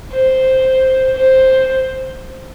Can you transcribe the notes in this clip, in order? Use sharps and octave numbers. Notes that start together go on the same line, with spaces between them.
C5
C5